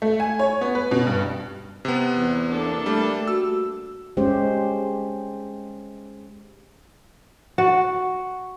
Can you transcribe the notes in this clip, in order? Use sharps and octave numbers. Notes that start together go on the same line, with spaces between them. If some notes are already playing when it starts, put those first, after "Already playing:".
A3
G#5
C#5
B3
B4
B2
G2
C3 B3
E2
A#3 D4 A4
G3 A3
F#4 E6
G#3 C#4 G4 C5
F#4